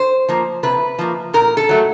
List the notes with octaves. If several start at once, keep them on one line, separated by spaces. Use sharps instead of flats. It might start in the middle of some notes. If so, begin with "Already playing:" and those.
Already playing: C5
F3 A#3
C3 B4
F3 A#3
A#2 A#4
A4
F#3 A3